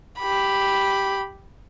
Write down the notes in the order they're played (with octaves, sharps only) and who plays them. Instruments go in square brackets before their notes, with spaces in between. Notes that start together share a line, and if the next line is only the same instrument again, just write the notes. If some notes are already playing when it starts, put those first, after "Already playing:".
[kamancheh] G4 B5